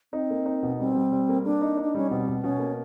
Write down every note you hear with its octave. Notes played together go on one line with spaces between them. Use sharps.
C4 D#4
A#3
D#4
B2
G3 C4
G3
G3
A#3
A#3 D4
D#4
D#4
D4
G3 C#4
B2 C4
B2
B2 C#4
A#3